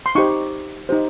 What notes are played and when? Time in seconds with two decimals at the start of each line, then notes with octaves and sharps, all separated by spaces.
0.06 C6
0.15 D#4 G4 C5 C#6
0.89 D#4 G4 C5